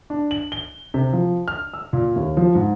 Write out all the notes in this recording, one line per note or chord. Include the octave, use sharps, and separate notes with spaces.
D4
F#7
G7
C3
F3
F6
E6
A#2
D#2
F3
G#2